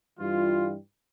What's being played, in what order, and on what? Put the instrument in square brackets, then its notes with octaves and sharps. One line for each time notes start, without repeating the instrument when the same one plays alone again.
[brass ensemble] G2 E3 G3 F4